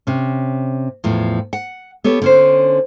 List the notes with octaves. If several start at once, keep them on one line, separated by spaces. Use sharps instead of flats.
C3 C#4
E2 A2 F3
F#5
B3 G4 A4 C#5
D3 C#4 C5